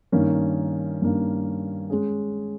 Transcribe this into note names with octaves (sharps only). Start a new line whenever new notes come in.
G2 D#3 A#3 C#4
G2 D#3 A#3 C#4
G#3 C#4 G#4